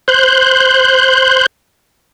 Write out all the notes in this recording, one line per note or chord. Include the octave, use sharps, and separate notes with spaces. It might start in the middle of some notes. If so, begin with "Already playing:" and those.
C5 F#6 G6